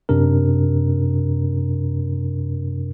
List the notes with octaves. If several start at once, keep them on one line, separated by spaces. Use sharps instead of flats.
F#2 C3 D4 A#4